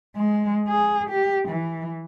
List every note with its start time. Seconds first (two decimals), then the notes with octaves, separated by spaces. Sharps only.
0.16 G#3
0.68 G#4
1.09 G4
1.48 E3